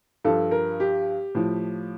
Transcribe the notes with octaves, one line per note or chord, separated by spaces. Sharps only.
G2 F3 A4
A#4
G4
A2 F3